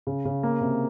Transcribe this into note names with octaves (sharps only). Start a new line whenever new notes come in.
C#3
C#3
A#3
C3